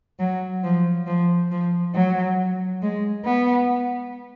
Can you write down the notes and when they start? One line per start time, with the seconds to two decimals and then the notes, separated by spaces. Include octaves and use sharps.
0.19 F#3
0.64 F3
1.07 F3
1.51 F3
1.95 F#3
2.82 G#3
3.26 B3